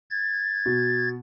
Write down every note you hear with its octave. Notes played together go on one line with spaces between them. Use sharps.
G#6 A6
B2